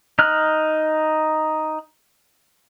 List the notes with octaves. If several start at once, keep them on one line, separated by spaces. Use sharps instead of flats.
D#4 F6 F#6